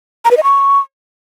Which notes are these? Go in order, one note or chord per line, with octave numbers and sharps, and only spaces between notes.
A#5
B4
D#5
C#6